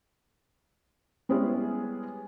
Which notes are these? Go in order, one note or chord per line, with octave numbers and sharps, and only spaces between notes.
G3 G#3 B3 C#4 E4 G#4